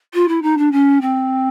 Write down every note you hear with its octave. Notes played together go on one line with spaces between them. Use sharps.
F4
E4
D#4
D4
C#4
C4